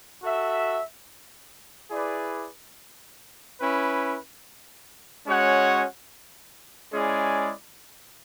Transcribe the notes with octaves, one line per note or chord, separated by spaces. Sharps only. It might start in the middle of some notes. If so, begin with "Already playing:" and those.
F#4 A4 E5
E4 G#4 B4 D5
C#4 E4 B4
G#3 C#4 F#4 C#5 F#5
G#3 C#4 E4 G#4 D5